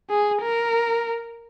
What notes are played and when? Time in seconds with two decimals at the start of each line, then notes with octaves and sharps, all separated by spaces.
0.10 G#4
0.43 A#4